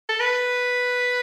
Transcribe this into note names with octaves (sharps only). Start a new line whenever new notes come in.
A4
B4